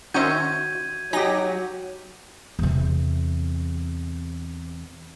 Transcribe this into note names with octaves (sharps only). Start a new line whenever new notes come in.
D#3 C#4 F#4 C5 E5 G6 G#6 D#7
F#3 D#4 G4 G#5 A#6
E2 C3